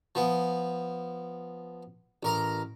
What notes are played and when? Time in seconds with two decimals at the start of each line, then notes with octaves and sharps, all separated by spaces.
0.15 F3 B3
2.23 A1 A#4 A#5